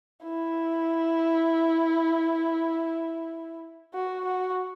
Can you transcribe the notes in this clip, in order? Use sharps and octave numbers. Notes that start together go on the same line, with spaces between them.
E4
F#4
F#4